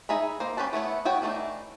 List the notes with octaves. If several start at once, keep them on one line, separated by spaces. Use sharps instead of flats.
D#4 G#4 E5 A#5 B5
A#3 C5
C#4 G4 A4 B4 A5
A3 B3 E4 C#5
B3 F#4 C#5 G5
E3 A3 D4 D#4